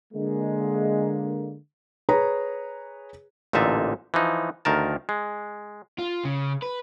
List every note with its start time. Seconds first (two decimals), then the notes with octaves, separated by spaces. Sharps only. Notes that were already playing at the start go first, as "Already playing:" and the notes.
0.13 D3 G#3 A#3
2.09 G#4 B4 C#5 A#5
3.53 A1 A#2 D3 D#4 E5 A5
4.14 E3 F3 D#4
4.65 D2 D#3 A#4 A5
5.09 G#3
5.99 F4
6.25 C#3
6.62 B4